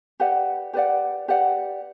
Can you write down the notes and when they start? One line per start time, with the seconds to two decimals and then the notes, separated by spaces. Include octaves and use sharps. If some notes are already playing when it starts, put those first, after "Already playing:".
0.20 G4 B4 D5 F#5
0.73 G4 B4 D5 F#5
1.28 G4 B4 D5 F#5